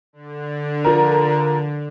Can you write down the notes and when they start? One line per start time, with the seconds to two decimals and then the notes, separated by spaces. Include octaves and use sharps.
0.13 D3
0.84 F3 A#4